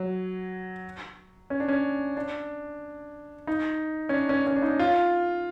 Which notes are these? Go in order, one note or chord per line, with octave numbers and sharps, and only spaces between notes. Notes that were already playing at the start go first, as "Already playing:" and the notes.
Already playing: F#3
C#4
D4
C#4
D4
D#4
C#4
D4
C#4
C#4
D4
D#4
F4